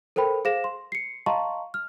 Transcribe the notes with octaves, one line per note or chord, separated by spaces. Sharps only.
A4 A#4 C5 G5 B5
G#4 C5 F5 A#6 E7
C6
C7 C#7
D#5 F5 A5 A#5 C6 C#6
F6